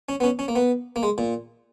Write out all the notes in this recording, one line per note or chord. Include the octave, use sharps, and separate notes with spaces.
C#4
B3
C#4
C#4
A#3
B3
A#3
G#3
A#2